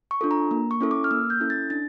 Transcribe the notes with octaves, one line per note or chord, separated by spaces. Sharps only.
C#6
D4 F4 A4
A#5
A#3
C#6
C#4 E4 A4
D6
F6
A#3 E6
G6
C#4 E4 A4
A6
D4 A6